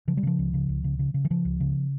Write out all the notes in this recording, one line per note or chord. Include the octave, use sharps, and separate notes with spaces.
C#3 F3
G3
C#3 F3
C#2
C#3
C#2
C#3
C#3
C#3
E3
C#3 F3
C#2
C#3